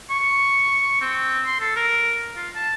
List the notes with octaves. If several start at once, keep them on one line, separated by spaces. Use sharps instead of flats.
C#6
C4
C6
A4
A#4
F4
A5